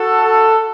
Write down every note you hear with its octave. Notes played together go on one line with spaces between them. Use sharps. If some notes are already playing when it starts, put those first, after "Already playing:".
Already playing: F#4 A4